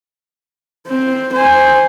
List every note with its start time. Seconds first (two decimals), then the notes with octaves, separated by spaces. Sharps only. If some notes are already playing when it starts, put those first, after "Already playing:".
0.87 C4
1.33 C5 G#5